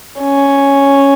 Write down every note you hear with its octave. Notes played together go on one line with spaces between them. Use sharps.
C#4